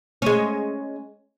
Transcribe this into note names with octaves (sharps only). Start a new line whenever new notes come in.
G#3 C#4